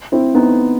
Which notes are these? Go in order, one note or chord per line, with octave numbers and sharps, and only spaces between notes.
C4 E4
B3 D#4